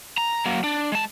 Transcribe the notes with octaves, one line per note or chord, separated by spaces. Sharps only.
A#5
F#3 A#3
D4
G#3 A5